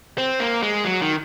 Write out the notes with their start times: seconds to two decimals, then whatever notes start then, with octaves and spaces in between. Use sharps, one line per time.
0.18 C4
0.40 A#3
0.62 G#3
0.85 F#3
1.02 D#3